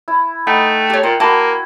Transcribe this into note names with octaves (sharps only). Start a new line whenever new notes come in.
E4
A3 D#4 F#5 G5
G4 C#5
A#2 F4
A#3 E4 F#4 A5